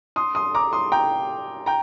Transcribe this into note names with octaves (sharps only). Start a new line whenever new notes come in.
C6 D#6
C6 D#6
A#5 D6
C6 D#6
G5 A#5
G5 A#5